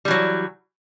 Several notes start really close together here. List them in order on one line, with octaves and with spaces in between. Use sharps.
G3 E3 F#3